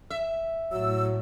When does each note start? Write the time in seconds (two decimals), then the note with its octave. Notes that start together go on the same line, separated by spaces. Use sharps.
0.10 E5
0.72 A2 F#3 E6